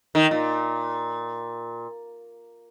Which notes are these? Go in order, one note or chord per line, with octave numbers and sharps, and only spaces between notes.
D#3
A#2